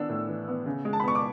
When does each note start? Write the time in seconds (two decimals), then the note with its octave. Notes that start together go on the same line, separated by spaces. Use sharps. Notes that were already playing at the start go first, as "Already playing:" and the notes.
Already playing: E3 B3 D4 E6
0.10 A2
0.28 E3
0.48 B3
0.66 C#3
0.85 G#3
0.93 A5
1.00 B5
1.04 B3 C#6
1.15 D6